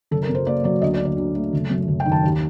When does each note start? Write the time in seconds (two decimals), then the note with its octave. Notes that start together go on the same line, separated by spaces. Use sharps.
0.11 F#1 A4
0.22 A#4
0.29 F#2
0.35 C5
0.47 A#3 D5
0.64 F#3 D5
0.82 D2 D#5
0.94 D5
1.00 D3
1.05 D5
1.17 D2
1.35 A3
1.53 F#1
1.70 F#2
1.88 F#1
2.00 G5
2.06 D#3
2.12 A5
2.23 D#2